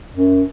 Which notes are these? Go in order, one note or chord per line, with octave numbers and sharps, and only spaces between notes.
F#2